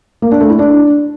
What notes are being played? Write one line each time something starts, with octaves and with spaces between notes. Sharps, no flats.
A#3
D4
A3
E4
D4